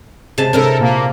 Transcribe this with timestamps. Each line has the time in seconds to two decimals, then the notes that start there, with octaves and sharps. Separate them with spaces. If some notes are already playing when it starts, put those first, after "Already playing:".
0.38 C3 G#3 A5
0.53 C3 D4 E4 A4 A#4
0.79 A#2 A#3